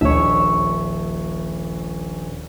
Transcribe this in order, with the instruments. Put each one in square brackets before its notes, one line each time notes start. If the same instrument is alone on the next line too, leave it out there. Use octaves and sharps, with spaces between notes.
[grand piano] D#1 A#1 [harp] C#5 E5